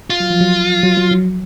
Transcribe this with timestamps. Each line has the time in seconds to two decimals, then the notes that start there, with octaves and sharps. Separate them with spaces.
0.10 F4
0.20 F#3
0.30 F3
0.41 F#3
0.83 F#3
0.97 F#3
1.11 F#3